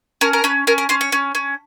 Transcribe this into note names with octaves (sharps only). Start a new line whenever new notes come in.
C#4 A#4
A#4
C#4 B4
C#4 A#4
A#4
C#4 C5
C#5
C#4
C#4